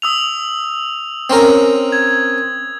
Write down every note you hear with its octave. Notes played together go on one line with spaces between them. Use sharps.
D#6 E6 F7
C4 C#4 A#4
G#6